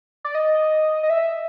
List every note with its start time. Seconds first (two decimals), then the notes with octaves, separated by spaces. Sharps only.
0.25 D5
0.35 D#5
1.03 D#5
1.10 E5